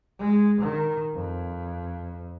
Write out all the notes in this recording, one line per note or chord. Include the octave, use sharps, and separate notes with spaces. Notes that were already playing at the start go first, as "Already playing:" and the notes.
G#3
D#3
F2